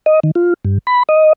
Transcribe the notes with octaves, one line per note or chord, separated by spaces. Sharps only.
D#5
D#3
F4
G2
B5
D#5